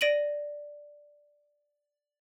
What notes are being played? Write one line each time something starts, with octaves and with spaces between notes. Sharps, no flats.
D5 A#6 D7 D#7 F#7